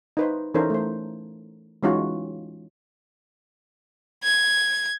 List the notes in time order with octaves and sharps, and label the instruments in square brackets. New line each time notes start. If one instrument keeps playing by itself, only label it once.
[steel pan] D#4 B4 C5
E3 C#4 D#4 A4 A#4 C5
A3 C5
E3 G#3 C#4 D#4 F4 F#4
[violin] G#6